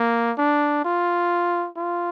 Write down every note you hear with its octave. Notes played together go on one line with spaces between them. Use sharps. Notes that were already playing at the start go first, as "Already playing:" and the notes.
Already playing: A#3
D4
F4
F4